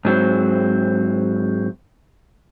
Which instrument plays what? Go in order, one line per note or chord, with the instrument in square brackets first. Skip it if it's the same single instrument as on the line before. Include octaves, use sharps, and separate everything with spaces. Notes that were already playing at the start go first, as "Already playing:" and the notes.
[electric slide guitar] G#2 F#3 C4